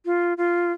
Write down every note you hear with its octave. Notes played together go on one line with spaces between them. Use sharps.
F4
F4